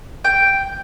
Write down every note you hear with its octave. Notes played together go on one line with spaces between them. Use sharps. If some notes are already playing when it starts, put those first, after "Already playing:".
G5